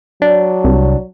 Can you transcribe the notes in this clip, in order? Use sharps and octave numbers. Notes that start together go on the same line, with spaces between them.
F#3 D4
C2